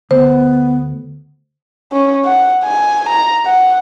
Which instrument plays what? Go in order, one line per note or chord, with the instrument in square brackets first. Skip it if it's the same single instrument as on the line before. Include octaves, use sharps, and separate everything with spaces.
[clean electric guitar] D2 [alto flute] B3 [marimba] C5
[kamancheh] C#4
F#5
G#5
A#5
F#5